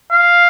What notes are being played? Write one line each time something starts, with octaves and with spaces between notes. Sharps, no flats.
F5